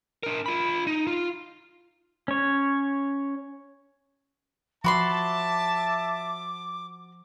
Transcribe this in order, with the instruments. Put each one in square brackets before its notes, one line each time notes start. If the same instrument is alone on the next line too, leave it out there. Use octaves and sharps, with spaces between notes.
[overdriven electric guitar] D4 A#4
F4 B5
D#4
F4
[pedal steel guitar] C#4 C#5
[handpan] F3 [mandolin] F#4 B5 C6 [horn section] E5 A5 [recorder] D6